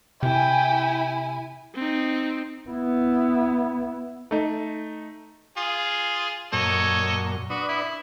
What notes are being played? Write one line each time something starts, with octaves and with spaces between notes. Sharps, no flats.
C3 E4 G5 G#5
C4 D#4
B3 E4
A3 D#4
F4 G#4
F#2 A#2 A4 C#5 D#5
D4 F#4 B4 D#6
E4